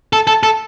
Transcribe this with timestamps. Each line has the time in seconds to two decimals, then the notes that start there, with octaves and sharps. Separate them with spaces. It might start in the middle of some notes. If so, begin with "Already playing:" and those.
0.13 A4
0.27 A4
0.43 A4